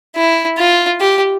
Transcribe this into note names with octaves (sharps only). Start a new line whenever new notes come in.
E4
F4
G4